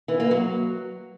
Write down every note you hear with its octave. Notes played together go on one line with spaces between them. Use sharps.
E3
A#3
F#3